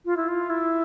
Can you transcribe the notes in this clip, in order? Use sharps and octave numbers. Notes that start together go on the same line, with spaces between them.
F4
E4
F4
E4